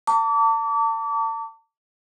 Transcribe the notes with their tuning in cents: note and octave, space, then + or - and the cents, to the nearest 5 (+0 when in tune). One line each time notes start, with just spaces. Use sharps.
A5 +35 D6 -35